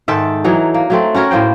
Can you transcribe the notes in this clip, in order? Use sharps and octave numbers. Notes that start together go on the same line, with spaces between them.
G#2 D#3 A4 E5
E3 F#3 D#4
A#3
F#3 A3 C4
C#4 F#4 A#4 C#5
A2 A#3 C5 G5